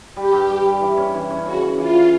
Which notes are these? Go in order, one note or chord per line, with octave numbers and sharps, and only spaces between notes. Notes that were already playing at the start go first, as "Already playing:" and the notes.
G3 G4
G2
G3
G3
E3
C#4
E3
C#4
C#3 F#4
C#4
E3 F4
C#4